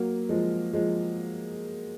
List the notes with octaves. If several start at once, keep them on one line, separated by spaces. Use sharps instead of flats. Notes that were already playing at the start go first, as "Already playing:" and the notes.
Already playing: F#3 A#3
F3 G#3
F3 G#3